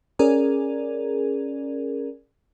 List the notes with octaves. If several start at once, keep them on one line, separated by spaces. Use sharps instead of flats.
C#4 G#4 A#4 D5